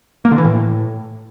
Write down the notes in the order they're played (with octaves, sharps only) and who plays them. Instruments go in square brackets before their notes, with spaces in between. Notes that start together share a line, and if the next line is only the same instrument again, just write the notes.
[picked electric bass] A#3
D3
E3
A2